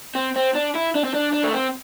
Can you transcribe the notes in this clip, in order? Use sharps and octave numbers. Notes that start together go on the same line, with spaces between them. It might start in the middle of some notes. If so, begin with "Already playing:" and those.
C4
C4
D4
E4
D4
C4
D4
D4
A3
C4